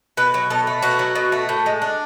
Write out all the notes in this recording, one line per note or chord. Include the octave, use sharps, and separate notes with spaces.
B2 B4
F#3
B2 A4
A3
B2 F#4
F#3
B2
A3
A2
G#3
D4